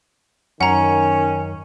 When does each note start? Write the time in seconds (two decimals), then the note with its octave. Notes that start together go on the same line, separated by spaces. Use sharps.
0.61 F#2 D#3 C#4 F#5 A#5